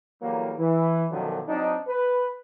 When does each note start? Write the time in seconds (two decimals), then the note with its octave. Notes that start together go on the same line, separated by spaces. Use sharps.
0.22 E2 A2 F#3 G3 A#3
0.58 E3
1.11 F#2 B2 D3 D#3 F3 F#3
1.48 F#3 C4 D4 D#4
1.88 B4